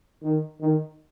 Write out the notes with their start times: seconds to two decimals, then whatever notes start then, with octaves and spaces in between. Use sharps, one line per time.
0.22 D#3
0.61 D#3